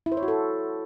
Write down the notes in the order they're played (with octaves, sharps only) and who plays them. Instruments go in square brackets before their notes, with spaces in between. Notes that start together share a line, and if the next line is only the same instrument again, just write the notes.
[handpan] E4
C5
C#5
F#4
A4